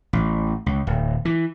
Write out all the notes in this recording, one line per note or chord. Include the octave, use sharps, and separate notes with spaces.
A1
C#2
D1
E3